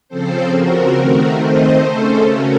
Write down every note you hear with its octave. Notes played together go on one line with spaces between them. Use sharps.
C#3 F3 C4 A4 C5
F#4 A#4
D#3 A3 C4
C5 D#5
C#3 A3 C#4 A4 C5
F#4 A#4